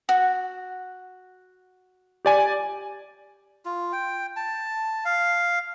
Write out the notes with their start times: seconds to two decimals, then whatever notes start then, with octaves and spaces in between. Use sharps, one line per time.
0.09 F#4
2.25 G4 D5 G#5
3.65 F4
3.92 G5
4.36 A5
5.05 F5